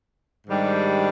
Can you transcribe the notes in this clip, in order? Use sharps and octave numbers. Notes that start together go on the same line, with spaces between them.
G#2 D#3 G3 D4